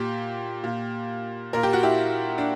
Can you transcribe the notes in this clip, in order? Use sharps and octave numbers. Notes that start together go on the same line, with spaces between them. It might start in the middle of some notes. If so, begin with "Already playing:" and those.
Already playing: A#2 G4
A#2
A#2 A#4
G4
F#4
E4 G4
D4